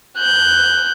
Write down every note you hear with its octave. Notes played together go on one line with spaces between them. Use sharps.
F#6 G6